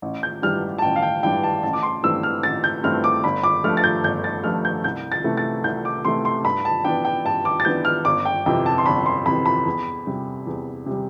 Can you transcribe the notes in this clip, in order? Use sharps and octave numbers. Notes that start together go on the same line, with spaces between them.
A1
G6
G2 E3 G3 D4 F6
A5
A1 G5
F5
G5
G2 E3 G3 D4 G5
A5
A1 A5
D6
C6
G2 E3 A3 C4 E6
F6
A1 A6
G6
G2 E3 A3 C4 F6
D6
G1 B5
D6
G2 F3 A3 F6
A6
G6
G1 G6
A6
G2 F3 A3 F6
G6
C2 G6
A6
C3 E3 A3
A6
C2 G6
D6
C3 E3 A3 C6
C6
G2 B5
A5
E3 B3 D4 G5
G5
G2 A5
D6
A6
E3 B3 D4 G6
F6
G1 D6
G5
F2 C3 E3 G5
A5
C6
G1 B5
C6
F2 C3 E3 B5
B5
E2
C3 G3
E2
C3 G3